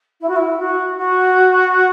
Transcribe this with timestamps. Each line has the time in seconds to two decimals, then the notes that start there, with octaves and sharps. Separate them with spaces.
0.20 E4
0.28 F#4
0.35 E4
0.59 F#4
0.97 F#4